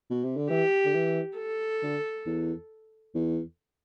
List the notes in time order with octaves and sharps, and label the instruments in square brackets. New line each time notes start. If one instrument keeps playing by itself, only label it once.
[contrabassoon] B2
C3
D3
[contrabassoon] E3 [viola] G4
[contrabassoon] D3
E3
[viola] A4
[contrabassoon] D3
E2
E2